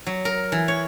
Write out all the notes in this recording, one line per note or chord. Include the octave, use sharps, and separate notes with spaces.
F#3
A#4
E3
C#5